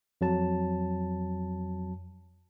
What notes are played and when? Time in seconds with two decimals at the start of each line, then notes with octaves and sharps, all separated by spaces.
0.21 F2 F#3 A5